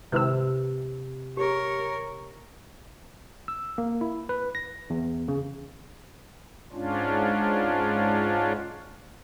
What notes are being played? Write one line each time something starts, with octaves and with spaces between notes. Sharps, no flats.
G#1 C3 E4 B4 C5 E6
G4 G#4 A#4 C#5
E6
A#3
E4
B4
A#6
E2
C#3
G#2 C#4 D4 F4